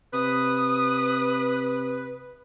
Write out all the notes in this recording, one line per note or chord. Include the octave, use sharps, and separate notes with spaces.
C3 B4 D#6